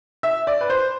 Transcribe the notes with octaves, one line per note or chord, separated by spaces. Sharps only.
E5
D5
B4
C5